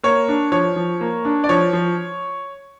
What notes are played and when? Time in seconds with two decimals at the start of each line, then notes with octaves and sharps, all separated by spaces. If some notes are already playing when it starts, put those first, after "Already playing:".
0.03 A#3 C#5
0.28 D4
0.52 F3 C#5
0.76 F3
1.01 A#3
1.25 D4
1.44 D5
1.49 F3 C#5
1.73 F3